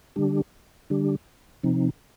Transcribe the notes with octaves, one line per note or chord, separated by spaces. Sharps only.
D3 G3 D4 G4
D3 G3 D4 G4
C3 F3 C4 D#4